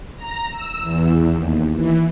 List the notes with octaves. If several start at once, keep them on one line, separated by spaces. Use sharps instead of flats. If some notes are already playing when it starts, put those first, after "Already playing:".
A#5
E6
E2
D#2
E3